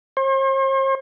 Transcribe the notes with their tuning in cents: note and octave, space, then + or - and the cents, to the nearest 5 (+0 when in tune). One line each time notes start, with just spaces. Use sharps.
C5 +45